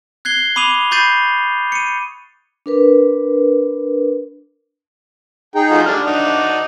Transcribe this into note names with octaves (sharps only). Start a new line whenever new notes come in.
F#6 G#6 C7 G7
B5 D6 D#6 D#7 F7
B5 C#6 G6 A6 C7 D#7
C#7 D#7
D4 A#4 B4
D#4 G#4 G5
F3 A3 F#4
D3 G3 D4 F6
D#4 F#4 D5